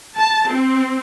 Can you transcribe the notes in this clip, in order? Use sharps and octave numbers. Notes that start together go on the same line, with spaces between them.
A5
C4